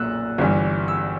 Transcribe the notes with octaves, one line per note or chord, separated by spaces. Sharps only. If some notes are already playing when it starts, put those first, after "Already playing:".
Already playing: B1 A#2 E6 F#6
G1 G2 E3
E6